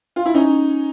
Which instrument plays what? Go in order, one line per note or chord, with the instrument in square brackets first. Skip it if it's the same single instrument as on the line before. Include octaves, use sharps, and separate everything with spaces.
[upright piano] F4
E4
C#4 D#4